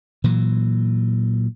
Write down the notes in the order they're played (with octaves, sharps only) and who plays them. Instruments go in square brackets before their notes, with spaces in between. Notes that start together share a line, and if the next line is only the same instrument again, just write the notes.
[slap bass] A#2 E3 F#3